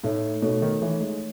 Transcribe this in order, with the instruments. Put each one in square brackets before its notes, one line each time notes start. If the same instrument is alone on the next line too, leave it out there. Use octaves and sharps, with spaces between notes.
[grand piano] A2 [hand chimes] A3 D#4 A4 C#5
[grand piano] B2 [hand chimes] A3 D#4 A4 C#5
[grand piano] D#3
[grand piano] E3 [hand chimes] A3 D#4 A4 C#5
[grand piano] G#3